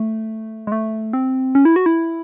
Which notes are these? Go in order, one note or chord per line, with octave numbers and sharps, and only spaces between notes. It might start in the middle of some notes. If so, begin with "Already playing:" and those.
Already playing: A3
G#3
A3
C4
C#4
E4
F#4
E4